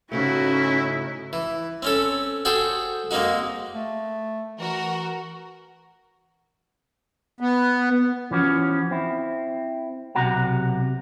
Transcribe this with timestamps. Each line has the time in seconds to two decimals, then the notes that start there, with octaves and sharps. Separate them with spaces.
0.12 G#2 C#3 A3 C#4 D#4 E4 F#4
1.33 E3
1.82 C4 C#4 A4
2.45 F#4 G#4 A4 C5 G5
3.11 G#3 A#3 C4 D#4 F#4
3.74 A3
4.59 E3 F#4 A#4
7.40 B3
8.31 E3 F3 C#4 F#4
8.91 C4 E4
10.15 B1 C3 F#4 F#5 A#5